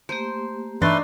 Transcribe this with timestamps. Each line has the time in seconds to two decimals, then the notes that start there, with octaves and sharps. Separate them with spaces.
0.09 A3 A#3 G4 C5
0.82 G2 E3 A3 D4 D#4 B4 C6 A6